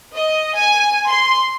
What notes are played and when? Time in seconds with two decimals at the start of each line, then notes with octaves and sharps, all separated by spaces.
0.14 D#5
0.55 G#5
1.07 C6